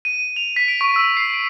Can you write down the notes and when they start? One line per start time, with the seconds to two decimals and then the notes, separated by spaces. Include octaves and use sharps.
0.05 D#7
0.36 F7
0.56 B6
0.68 D7
0.81 C#6
0.96 E6
1.17 C7
1.33 D7